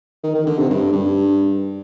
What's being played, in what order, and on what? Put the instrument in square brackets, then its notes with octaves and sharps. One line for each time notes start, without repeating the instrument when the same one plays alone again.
[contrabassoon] D#3
D#3
D3
C3
G2
G2